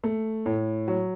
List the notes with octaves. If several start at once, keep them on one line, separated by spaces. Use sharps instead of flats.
A3
A2
F#3